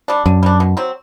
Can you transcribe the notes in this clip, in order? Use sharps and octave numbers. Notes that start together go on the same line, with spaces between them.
G3 D4
F#2 D3
G3 D4
B2
F#3 C4